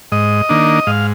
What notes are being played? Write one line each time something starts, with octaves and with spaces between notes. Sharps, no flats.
G#2 D#5
D#3 A#3 D4
G#2 F5